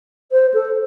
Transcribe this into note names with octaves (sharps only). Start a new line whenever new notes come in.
C5
A4